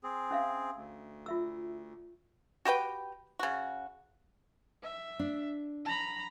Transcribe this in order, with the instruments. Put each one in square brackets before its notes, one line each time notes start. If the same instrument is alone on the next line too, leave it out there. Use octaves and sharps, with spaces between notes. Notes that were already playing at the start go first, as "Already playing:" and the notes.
[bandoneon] C4 G#4
[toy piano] C#4 E5 F5
[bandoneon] D2
[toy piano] F4 E5 E6
[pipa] F#4 G4 B4 G5
C#3 F#4
[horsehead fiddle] E5
[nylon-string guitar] D4
[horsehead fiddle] A#5 B5